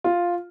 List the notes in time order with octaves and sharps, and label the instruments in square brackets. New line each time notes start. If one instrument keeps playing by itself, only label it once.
[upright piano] F4